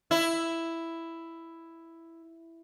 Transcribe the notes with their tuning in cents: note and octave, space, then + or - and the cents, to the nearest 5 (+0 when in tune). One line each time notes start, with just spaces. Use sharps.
E4 +5